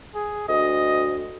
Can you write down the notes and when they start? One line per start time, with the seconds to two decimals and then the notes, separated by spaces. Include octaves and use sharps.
0.15 G#4
0.49 D2 D#5